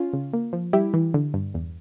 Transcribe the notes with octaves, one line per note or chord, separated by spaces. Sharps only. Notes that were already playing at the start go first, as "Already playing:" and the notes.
Already playing: C#4 F4
C#3
A#3
F3
G3 E4 G4
E3
D3
G2
E2